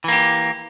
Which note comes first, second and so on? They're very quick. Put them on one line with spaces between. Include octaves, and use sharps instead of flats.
E3 A#3 G4